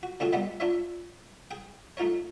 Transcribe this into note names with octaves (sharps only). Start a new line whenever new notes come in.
F#4
D3 A3 C4 F4 F#4 G#4
B2 G3 G#3 A#3 B3
D4 F4 A#4 C#5 E5
G#4 G5
A3 D#4 F4 A#4 C#5